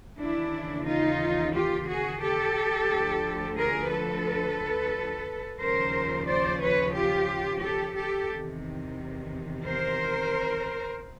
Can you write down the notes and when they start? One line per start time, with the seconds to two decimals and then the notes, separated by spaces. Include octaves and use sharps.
0.19 D#2 C#3 E3 D4 E4
0.87 D#4 F4
1.54 F4 G4
1.88 F#4 G#4
2.22 G4 A4
2.90 D2 D3 F3
3.57 G#4 A#4
3.91 A4 B4
5.60 D#2 C#3 F3 A#4 C5
6.28 C5 D5
6.61 B4 C#5
6.95 F4 G4
7.63 G4 A4
7.97 G4 A4
8.30 E2 C3 D#3
9.66 A#4 C5